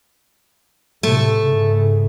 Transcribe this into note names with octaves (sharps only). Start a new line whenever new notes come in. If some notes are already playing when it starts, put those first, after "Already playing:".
A2 C3 A3
G#2 C#3